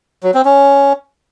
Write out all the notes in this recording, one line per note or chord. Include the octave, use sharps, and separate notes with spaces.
F#3
C4
C#4